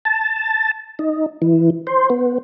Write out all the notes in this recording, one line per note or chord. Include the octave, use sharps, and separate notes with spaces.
A5
D#4
E3
C5
B3